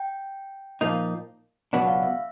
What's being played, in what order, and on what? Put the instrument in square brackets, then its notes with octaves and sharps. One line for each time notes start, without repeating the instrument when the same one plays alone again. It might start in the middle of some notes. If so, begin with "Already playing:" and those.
Already playing: [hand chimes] G5
[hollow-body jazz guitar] A#2 F3 A#3 D#4
[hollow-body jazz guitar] C#2 B2 F#3 B3 D4 [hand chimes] F#5
[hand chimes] F5
E5